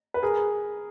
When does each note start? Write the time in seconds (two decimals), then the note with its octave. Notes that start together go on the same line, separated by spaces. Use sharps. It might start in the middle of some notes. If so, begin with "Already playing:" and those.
0.14 B4
0.22 G#4 A#4